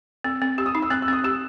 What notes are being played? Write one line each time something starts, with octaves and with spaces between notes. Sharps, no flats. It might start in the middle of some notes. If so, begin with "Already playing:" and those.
C4 E6
C4
G4 E6
D#6
D#4
E6
C4 F#6
E6
C4 D#6
G4 E6